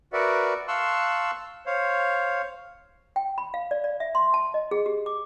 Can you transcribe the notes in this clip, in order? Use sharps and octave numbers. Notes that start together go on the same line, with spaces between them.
F#4 A#4 B4 D5 E5 F#5
F5 A5 C6 C#6 E6 F#6
C5 C#5 F5
G5
B5
F5
D5
D5
E5
C6
A5
D#5
G#4
G4
D6